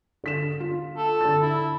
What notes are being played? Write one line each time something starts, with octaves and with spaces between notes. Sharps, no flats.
D3 B6 E7
F4
A4
D3 A6
E4